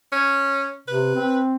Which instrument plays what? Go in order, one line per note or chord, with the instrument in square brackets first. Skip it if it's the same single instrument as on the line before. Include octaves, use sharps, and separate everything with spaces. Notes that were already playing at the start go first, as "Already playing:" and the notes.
[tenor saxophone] C#4
[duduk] C3 [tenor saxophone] B4
[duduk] C4